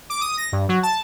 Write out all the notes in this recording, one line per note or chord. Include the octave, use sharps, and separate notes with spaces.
D6
D#6
A#6
G2
F#3
A5